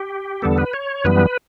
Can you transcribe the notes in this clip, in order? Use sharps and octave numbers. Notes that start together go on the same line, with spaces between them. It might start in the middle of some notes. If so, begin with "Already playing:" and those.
Already playing: G4
E2 D3 G3 B3 A4
B4
C#5
F#2 E3 G3 B3 B4